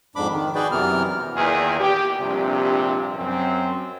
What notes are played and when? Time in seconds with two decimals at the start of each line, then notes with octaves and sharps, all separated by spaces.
0.16 F2 G#2 D4 B5 D6
0.31 D#3
0.55 F#4 G#4 B4 D5 G5
0.71 F#2 C3 E3 B3 A#4 F6
1.35 E2 A#2 D#3 G#4
1.80 G4
2.19 A#1 G2 C3
3.18 F#2 C4